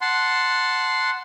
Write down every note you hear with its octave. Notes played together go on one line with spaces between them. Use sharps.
F#5 A5 C6